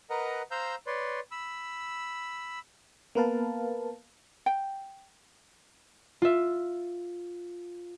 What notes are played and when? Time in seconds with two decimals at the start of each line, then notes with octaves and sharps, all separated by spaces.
0.10 A#4 B4 D#5 F#5 A#5
0.51 C5 F5 A#5 E6 G6
0.87 B4 C#5 D5 C6
1.31 B5 E6
3.15 A#3 B3 A#4 B4 F5 A5
4.46 G5
6.22 F4 E5